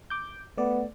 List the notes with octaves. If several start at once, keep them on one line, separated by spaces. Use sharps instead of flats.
D6 G6
A3 B3 D5